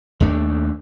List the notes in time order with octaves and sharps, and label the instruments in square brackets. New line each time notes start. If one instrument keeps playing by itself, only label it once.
[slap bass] D#2 A3 D4